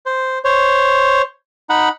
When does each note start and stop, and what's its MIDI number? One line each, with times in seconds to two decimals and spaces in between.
0.06 0.39 72
0.45 1.22 72
0.45 1.22 73
1.70 1.89 63
1.70 1.89 78
1.70 1.89 83